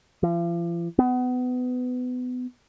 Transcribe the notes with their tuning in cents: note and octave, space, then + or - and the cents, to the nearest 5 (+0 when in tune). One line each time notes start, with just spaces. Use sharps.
F3 -45
B3 +25